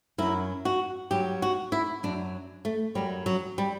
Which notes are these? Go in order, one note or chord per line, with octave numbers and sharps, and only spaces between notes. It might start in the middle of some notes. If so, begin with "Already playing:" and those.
F#2 F#3 E4
F#4
G2 F#3 G4
F#4
E4
F#2 F#3 D4
A3
F#2 F#3 G3
F#3
G3